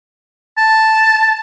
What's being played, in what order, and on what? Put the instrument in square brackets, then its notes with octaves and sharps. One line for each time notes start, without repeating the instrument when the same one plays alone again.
[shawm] A5